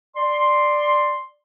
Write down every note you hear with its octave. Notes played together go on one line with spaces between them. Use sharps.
D5 C6